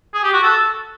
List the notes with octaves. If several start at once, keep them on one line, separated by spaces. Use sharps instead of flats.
G#4
G4
F#4
A4